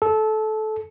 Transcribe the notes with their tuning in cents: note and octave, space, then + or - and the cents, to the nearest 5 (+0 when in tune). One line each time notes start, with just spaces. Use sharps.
A4 -20